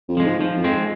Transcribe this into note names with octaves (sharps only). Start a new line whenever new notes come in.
F2
F3 G#3
G#2
F3
F2
G#3 C4